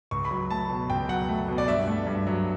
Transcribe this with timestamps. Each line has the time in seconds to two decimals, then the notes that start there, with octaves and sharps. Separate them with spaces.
0.11 C#2 C#6
0.25 B5
0.31 F#3
0.50 A3 A5
0.70 B2
0.90 C#2 G5
1.09 F#3 F#5
1.29 A3
1.48 B2
1.58 D5
1.68 G2 E5
1.87 A3
2.07 G2
2.27 F#3